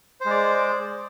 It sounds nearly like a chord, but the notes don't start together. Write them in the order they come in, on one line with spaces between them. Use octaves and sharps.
C5 G#3 D5